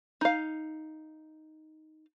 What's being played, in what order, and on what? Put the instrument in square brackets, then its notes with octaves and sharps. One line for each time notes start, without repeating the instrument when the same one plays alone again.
[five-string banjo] D#4 F5